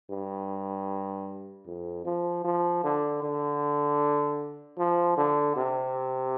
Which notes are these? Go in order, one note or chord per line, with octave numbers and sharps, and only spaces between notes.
G2
F2
F3
F3
D3
D3
F3
D3
C3